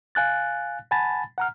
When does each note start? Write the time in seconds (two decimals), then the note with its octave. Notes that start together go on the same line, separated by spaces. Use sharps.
0.15 F5 G#5 F#6 A6
0.91 F#5 G#5 A5 B5 A6
1.38 F#5 A#5 F6